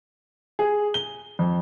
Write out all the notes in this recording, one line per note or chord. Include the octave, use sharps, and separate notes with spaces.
G#4
G7
F2